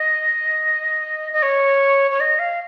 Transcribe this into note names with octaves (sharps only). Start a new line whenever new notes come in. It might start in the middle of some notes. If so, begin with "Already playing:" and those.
Already playing: D#5
D#5
C#5
C#5
D#5
F5